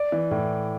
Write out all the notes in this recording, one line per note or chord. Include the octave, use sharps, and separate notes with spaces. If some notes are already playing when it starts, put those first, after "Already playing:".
Already playing: D5
E3
A2